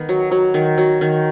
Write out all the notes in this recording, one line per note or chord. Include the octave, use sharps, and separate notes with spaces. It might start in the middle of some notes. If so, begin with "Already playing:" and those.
Already playing: D#3 B3
F#3
F#3
D#3
F#3
D#3